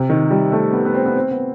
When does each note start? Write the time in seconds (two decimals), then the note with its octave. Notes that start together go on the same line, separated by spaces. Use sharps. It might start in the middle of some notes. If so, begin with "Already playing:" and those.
Already playing: C3
0.09 D#3
0.31 G3
0.52 A3
0.73 B3
0.85 B3
0.94 C4
1.06 B3
1.16 C4
1.31 B3